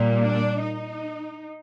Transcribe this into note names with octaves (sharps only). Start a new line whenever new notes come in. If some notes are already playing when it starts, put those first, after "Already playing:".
Already playing: A#2 G3 A#3
D4
D#4